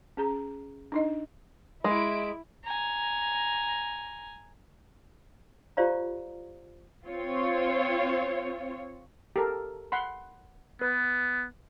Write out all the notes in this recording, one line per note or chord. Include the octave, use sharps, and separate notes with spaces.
C#4 G#4 A#5
D4 D#4 D#5
G#3 E4 D7
G#5 A#5
F4 G4 C5 D5 F5 A#5
C4 F4 C#5
G4 A4 A#4
F#5 B5 C6
B3 B4